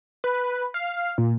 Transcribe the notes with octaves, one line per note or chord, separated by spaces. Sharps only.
B4
F5
A#2